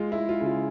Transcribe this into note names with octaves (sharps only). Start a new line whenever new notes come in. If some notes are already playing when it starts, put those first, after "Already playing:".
Already playing: G#3 F4
E4
G#3
F4
C#3
F4